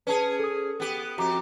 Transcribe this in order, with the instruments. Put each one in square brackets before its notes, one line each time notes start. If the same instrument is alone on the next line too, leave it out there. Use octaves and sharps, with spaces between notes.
[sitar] C#4 G#4 [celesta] B4 A5
[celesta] A4 D#6
[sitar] B3 G4
[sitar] F2 G4 [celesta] F#4 A#5 D6